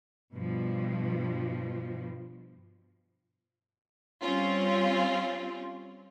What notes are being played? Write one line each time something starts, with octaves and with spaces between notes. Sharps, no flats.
G2 B2 F3
G3 C4 C#4 F4